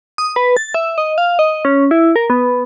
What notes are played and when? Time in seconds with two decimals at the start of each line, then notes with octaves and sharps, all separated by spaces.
0.18 D#6
0.36 B4
0.57 A6
0.74 E5
0.98 D#5
1.18 F5
1.39 D#5
1.65 C#4
1.91 E4
2.16 A#4
2.30 B3